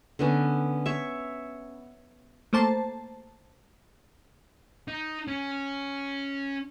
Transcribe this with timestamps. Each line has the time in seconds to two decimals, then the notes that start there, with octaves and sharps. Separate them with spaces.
0.19 D3 B3 C#4
0.86 C#5 E5
2.53 A3 A#3 C5 A5
4.88 D#4
5.28 C#4